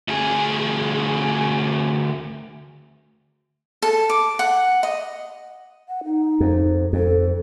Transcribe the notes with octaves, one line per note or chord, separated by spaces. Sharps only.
D2 G#4
A4
D6
F#5
D#5
F#5
D#4
F2
F2 A4